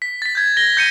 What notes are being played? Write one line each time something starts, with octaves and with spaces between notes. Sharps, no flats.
B6
A6 B6
G6 G#6
A#6 G7
G6 C#7 D#7